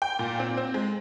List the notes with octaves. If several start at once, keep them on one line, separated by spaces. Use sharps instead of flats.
G5
A#2
C4
C4
G#3